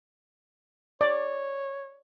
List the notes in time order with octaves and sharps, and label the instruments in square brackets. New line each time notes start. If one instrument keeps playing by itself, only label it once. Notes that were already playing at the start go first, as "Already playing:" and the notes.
[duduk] C#5 [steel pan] D5